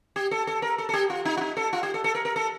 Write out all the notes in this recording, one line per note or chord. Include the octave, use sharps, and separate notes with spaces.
G4
A4
A4
A#4
A4
A4
G4
F4
D#4
F4
D#4
A4
F4
G4
A4
A4
A#4
A#4
A4